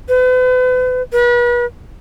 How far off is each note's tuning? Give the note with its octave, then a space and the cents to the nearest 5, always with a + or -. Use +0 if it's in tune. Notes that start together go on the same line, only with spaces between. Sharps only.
B4 +40
B4 -40